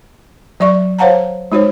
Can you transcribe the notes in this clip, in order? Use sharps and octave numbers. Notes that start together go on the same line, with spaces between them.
F#3 D5 E5 C#6
C5 C#5 F5 F#5 A5 A#5
G#3 D#4 F#4 C5 C#5